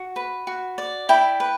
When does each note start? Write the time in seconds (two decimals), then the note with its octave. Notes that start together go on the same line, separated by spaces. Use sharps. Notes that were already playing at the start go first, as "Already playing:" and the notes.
Already playing: F#4
0.16 B4
0.47 F#4
0.78 D5
1.09 E4 G5 B5
1.40 B4